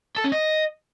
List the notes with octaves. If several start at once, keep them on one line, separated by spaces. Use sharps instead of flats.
A4
C#4
D#5